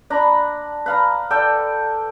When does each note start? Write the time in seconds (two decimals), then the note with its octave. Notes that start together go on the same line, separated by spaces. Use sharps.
0.10 D4 A#5 B5
0.86 B4 F5 A#5
1.30 A4 D5 G5